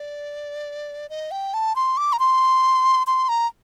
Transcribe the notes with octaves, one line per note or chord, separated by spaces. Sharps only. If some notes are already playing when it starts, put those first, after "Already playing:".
Already playing: D5
D#5
G5
A5
C6
D6
A#5
C6
C6
A#5